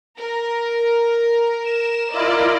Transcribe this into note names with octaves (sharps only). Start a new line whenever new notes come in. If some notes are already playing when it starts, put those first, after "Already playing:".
A#4
E7
E4 F4 A#4 D5 D#5